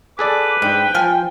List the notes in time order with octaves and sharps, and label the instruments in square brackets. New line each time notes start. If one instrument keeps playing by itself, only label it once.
[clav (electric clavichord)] G#4 A4 D5 [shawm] B4 [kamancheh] D6
[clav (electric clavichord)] G#2 [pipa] D4 [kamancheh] G5
[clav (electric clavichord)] F3 [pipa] F4 G#5